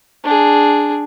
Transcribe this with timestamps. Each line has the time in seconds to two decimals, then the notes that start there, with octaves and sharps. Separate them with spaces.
0.24 D4 G#4